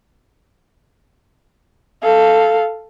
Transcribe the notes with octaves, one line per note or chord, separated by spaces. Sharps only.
A4 F5